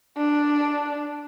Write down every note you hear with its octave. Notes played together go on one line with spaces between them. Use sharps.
D4